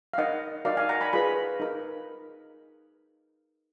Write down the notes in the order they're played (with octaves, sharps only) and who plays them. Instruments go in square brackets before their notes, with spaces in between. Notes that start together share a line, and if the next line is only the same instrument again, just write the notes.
[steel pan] F5
D#4 A#4 D#5 F#5
D#4 F#4 A#4 D5 F5
F5 G#5
F#5 A#5
G#5 B5
F4 G#4 B4 G#5 B5
D#4 A#4